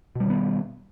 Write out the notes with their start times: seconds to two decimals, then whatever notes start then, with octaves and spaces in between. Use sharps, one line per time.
0.15 B2
0.20 G3
0.25 D#3
0.30 B3